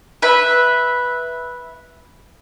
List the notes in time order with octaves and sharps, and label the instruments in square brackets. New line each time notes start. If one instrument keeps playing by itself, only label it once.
[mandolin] B4 E5